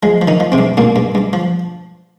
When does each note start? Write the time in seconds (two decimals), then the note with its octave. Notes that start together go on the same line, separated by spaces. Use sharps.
0.03 F3 G#3
0.22 F3
0.28 D#3 D#4
0.40 F3
0.52 C3 C4
0.58 G2
0.77 G2 A#2 A#3
0.96 G2
1.15 G2
1.33 F3